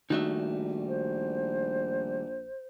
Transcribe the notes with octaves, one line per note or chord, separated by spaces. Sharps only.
A#1 D#3 G3 A3 D#4 F#4 E5
C5